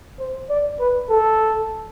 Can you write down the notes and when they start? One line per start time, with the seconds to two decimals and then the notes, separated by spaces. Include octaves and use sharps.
0.19 C5
0.50 D5
0.80 B4
1.10 A4